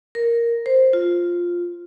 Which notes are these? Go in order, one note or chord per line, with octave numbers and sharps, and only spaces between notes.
A#4
C5
F4